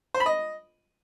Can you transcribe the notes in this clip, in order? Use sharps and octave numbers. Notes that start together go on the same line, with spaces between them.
C5
B5
D#5